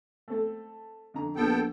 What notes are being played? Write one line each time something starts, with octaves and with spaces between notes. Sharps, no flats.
A3 C4 A4
F2 D3 A#5
A#1 B3 A4 G5